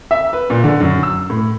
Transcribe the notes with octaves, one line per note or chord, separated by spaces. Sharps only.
E5
B4
A#2
D3
F#2
E6
A2